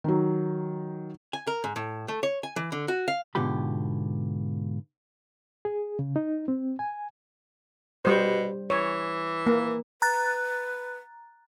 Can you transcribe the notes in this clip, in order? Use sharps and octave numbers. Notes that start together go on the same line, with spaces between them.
D#3 F#3
G#5
A#4
G#2
A2
A3
C#5
G#5
E3
D3
F#4
F5
G#2 B2 D3 F4 G4 B5
G#4
C#3
D#4
C4
G#5
B2 G3 C5
E3 C#5
A#3
B4 A#5 F#6 A6